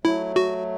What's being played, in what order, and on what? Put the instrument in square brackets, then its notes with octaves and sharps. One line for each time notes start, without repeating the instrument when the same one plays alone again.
[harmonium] F#3 A3 [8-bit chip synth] E4
[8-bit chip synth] F#4